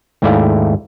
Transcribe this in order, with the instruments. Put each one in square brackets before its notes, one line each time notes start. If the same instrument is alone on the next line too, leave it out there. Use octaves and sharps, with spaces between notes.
[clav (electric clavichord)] D#2 G#2 A3 E4 D5 F5